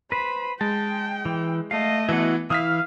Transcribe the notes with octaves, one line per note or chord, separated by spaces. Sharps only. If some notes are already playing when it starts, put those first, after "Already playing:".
B4 C5 B5
G#3 G5 A5
E3
A3 D#5 F5
E3 B3 E4 F#4 F#5
E3 E4 F5 D#6 F6 B6